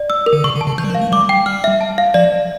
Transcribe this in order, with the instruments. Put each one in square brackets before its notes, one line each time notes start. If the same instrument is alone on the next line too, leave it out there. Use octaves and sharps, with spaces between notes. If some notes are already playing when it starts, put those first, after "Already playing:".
Already playing: [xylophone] D5
E6
A#4
[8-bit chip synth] D3
[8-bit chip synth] C#3 [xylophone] C#6
[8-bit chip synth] D3
[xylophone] A5
[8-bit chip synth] C#3
[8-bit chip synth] E3 [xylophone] G6
[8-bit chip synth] G3
F3
[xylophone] F5
[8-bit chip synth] A3
[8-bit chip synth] G3 [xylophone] D6
[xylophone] G5
[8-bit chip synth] G3 [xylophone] F6
[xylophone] E5
A5
F5
[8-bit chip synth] F3 [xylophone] D5
[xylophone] D5